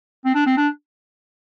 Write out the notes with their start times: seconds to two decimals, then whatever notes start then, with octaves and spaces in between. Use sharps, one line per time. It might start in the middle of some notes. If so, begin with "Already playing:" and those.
0.25 C4
0.35 D4
0.46 C4
0.57 D4